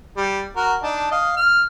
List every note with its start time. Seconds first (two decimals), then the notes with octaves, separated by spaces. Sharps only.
0.17 G3
0.57 F#4 A#4
0.83 D4 D#4 A5
1.12 D#5 F5
1.37 F6